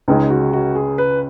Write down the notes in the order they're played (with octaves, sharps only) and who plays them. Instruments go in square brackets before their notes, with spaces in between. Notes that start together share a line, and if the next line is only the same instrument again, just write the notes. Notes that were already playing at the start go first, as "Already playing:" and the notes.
[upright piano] C#2 C#3 G#3 [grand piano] D#4
[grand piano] F#4
F#4
G#4
B4